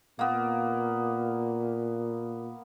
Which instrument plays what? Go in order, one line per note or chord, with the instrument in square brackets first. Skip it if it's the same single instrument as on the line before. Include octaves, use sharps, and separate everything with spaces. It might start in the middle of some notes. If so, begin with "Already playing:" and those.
[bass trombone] A#2 [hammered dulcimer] A#3 B3